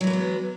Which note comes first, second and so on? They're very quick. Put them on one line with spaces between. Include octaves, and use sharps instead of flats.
F#3 E3 A3 G#3 B3